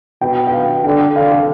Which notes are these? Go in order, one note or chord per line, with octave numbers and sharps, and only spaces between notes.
B2 G5
G5
F5
D3 G5
D3 F5
F5